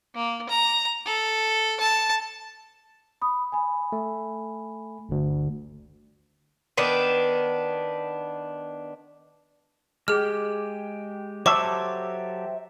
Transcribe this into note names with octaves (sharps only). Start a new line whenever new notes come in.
A#3
A#5
A4
A5
B5 D#6
G#5 B5
A3
G1 D2
D#3 B3 D4
G#3 G4 G#4 F6
F#3 G4 A4 C5 E5 A5 C#6 D6